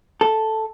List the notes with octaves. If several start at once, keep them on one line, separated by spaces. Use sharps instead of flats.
A4